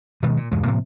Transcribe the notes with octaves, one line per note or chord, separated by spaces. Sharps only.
B2 D#3 G#3 B3
A#2
F1 E2 G#2 G#3
A2 C3 F3 A#3